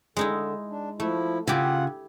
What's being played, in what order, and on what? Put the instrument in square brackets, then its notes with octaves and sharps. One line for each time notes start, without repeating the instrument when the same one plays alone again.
[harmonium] D3 [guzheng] G#3 D#4 E4
[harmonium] D4
[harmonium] F3 E4 [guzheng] A3
[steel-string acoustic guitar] C#3 [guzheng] E4 G4 [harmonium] F4 F#5